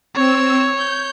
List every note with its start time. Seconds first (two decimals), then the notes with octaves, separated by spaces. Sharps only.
0.15 C4 C#5 E6
0.75 G6